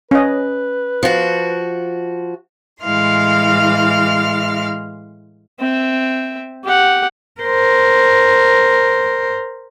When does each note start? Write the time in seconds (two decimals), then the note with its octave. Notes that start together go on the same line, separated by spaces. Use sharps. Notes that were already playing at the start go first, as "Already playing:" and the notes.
0.11 C#4 B4 D#5
1.03 F3 F#4
2.83 A2 E3 G#3 F5 C6 F6
5.60 C4 E5
6.64 G4 F#5
7.41 A#4 C5